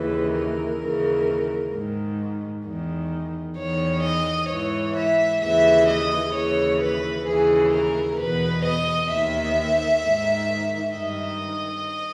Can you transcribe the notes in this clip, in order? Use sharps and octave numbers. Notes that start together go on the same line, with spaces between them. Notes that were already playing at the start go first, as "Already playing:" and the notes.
Already playing: D#2 C#3 E3 B4
A#4
D#2 C#3 E3
G#2 D#3
E2 D#3
E2 D#3 C#5
D#5
G#2 E3 C#5
E5
D#2 C#3 E3 E5
D#5
D#2 C#3 E3 C#5
B4
D#2 C#3 E3 G#4
A#4
E2 B2 B4
D#5
D#2 D#3 E5
G#2 D#3
G2 D#3 D#5